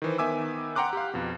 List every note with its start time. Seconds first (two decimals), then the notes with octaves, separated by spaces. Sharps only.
0.02 D#3 E3 C5
0.18 D#3 B3 E5 G#5 D6 E6
0.76 F#5 G5 A#5 C6 D6 F#6
0.93 G4 F5
1.14 F2 B2